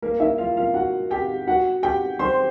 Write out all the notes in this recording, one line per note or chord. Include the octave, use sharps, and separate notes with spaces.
A#3 A#4
E4 E5
F4 F5
F4 F5
F#4 F#5
G4 G5
F#4 F#5
G4 G5
C5 C6